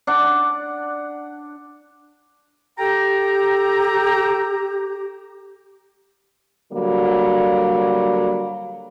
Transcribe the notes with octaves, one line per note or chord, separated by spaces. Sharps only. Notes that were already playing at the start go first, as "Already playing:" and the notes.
D4 D5 F#5 D6
G4 A4 G5 A#5
D3 F#3 G3 A#3